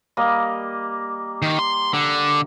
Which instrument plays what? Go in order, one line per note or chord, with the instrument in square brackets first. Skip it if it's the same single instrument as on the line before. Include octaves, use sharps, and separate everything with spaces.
[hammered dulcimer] G3 A#3 D#5
[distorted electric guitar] D#3
C6
D3